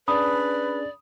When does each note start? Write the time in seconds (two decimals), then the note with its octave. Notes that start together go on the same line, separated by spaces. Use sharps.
0.08 C#4 D4 G#4 B4 D5 B5 D#6